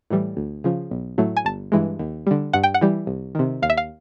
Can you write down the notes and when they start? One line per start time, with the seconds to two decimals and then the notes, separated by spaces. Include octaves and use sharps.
0.10 A2 E3 G3
0.37 D2
0.64 C#3 F3
0.91 B1
1.18 A2 F#3 A3
1.37 G#5
1.45 G1 A5
1.72 G2 E3 G#3
1.99 D#2
2.27 D3 G3
2.53 G2 F#5
2.63 G5
2.74 F#5
2.81 E3 G3
3.07 C2
3.35 C3 D#3
3.62 D#2 F5
3.70 E5
3.77 F5